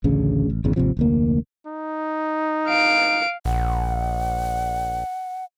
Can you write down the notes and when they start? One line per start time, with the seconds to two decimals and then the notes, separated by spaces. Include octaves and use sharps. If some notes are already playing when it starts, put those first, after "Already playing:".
0.04 A1 D2 C#3
0.50 A1
0.64 G1 E2 C#3
0.76 G#1 D#2 C3 F3
0.97 F1 D2 A#3
1.67 D#4
2.67 F5 D7
3.45 A#1 F#5